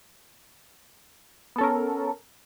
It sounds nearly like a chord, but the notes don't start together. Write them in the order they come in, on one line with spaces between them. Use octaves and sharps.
B3 A4 C#4 A#4